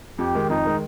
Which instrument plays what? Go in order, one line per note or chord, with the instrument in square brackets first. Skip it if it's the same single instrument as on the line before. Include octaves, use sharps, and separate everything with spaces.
[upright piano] F2 [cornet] G4
[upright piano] D#3 G#3
[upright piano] F2 [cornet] D#4
[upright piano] D#3 G#3